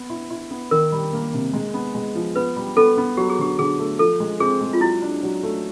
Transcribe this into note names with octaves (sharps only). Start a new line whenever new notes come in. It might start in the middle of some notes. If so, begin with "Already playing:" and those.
Already playing: B3
E4
E4
B3
D#3 A#4
G3
A#3
C3
G#3
B3
G#3
F3
B3 B4
G3
B3 A4
B3
F#3 G4
G#4
D3 G4
D3 G#4
A3
F3 A4
G#3
C4 G#4
G#3
F4
F#3 E4
D4
F#3
A3